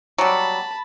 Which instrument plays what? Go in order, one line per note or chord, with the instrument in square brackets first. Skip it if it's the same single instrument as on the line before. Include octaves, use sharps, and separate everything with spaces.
[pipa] F#3 G3 [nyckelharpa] A5 B5